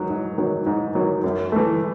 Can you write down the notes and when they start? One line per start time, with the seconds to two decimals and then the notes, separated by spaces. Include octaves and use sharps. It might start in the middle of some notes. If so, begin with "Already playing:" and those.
Already playing: D#3 F#3
0.10 G#2
0.38 D#3 F#3
0.66 G#2
0.95 D#3 F#3
1.24 F#2
1.52 E3 A3